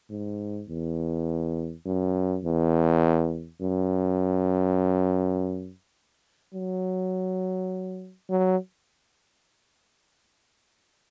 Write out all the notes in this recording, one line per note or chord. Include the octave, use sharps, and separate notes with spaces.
G#2
E2
F#2
E2
F#2
F#3
F#3